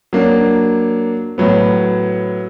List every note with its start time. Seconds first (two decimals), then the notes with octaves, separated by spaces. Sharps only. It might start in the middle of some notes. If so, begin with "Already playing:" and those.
0.13 F#3 A#3 D4
1.38 A2 F#3 B3